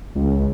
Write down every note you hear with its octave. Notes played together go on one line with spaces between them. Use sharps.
C#2